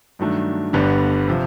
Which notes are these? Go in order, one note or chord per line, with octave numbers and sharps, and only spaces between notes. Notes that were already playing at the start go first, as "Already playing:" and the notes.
G2 D#3 F#3 A3 D4
G1 G2 D3 G3 B3
C3 F3